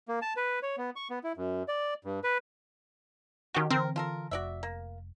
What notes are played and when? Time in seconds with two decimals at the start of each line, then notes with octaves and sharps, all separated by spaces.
0.08 A#3
0.22 A5
0.37 B4
0.63 C#5
0.78 B3
0.96 C#6
1.10 B3
1.24 E4
1.37 F#2
1.68 D5
2.05 G2
2.24 B4
3.55 D#3 C#4 F#4 G4
3.71 D3 E3 C4 A#4
3.96 F4 A4 A#4
4.31 F1 F#4 D5 E5
4.63 A#3